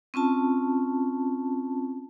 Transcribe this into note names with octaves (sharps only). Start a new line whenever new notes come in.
C4 C#4 F4 A5